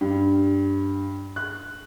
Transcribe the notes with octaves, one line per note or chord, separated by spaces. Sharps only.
G2
F#6